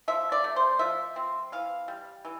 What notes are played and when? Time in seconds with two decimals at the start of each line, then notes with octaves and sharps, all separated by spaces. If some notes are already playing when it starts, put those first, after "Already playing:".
0.08 F3 E5
0.32 D5
0.44 A3
0.56 C5
0.79 F3 E5
1.16 C4
1.52 E3 F5
1.88 G3
2.25 E3